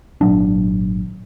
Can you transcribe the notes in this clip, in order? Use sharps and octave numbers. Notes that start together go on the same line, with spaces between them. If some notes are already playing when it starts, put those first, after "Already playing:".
G#1 A#2 F#3 D4